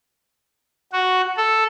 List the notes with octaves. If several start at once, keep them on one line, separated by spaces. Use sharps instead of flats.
F#4
A4